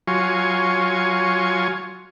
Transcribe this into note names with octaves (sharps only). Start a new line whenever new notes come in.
F#3 F4 G#5 C#6